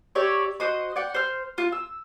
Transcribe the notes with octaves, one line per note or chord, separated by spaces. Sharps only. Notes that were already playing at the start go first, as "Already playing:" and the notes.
G4 C#5 D5 E5
F#4 C5 D#5 D#6
D5 F#5 G5
C5 F6
F4
E6